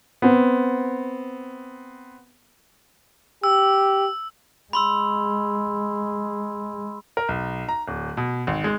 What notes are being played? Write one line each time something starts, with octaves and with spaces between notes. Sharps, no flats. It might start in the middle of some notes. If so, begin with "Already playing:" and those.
B3 C4
G4 E6
G#3 B5 C6 E6
A#4
B1
A#5
D1
B2
G#1
G#3